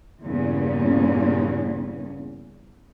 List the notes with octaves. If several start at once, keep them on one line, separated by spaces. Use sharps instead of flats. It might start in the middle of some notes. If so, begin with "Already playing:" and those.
E2 G2 A#2 C#3 C#4